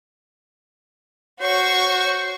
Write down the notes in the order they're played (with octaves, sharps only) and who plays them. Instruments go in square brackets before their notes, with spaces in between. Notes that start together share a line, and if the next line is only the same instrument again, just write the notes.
[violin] F#4 C#6 [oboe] C5 [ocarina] C#5